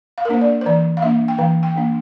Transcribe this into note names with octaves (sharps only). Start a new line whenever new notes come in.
F5
A#4
A#3 D4 C5
D5
C5
E3 D5
F5
A#3 D4 E5
G5
E3 F5
G5
A#3 D4